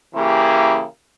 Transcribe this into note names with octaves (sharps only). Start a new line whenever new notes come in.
C#3 E3 A#3 E4 G4